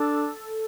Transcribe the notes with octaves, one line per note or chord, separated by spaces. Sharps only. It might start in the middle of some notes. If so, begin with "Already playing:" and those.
Already playing: D4 A4